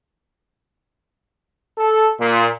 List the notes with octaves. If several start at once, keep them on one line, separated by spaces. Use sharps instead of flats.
A4
A#2